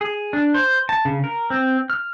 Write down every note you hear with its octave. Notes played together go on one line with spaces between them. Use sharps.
G#4
D4
C5
A5
C#3
A#4
C4
F6